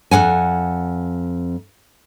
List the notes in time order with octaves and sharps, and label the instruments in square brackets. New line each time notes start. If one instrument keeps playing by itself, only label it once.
[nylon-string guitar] F2 F3 F#5 G#5